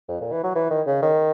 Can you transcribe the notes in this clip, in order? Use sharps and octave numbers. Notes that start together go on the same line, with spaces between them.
F2
A#2
E3
F#3
E3
D#3
C#3
D#3